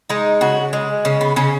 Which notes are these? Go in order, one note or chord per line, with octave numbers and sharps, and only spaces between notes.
G#3 D#4
C#3 F#4
G#3
C#3 C#4
B3
C#3 C#4